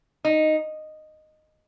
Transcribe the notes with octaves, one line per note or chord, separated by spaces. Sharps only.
D#4